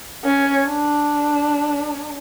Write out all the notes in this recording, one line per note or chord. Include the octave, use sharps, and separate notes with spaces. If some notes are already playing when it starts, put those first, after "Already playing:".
C#4
D4